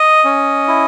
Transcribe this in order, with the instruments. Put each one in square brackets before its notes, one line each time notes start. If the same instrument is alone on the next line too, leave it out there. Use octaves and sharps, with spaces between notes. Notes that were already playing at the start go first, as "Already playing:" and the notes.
Already playing: [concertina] D#5
C#4
E4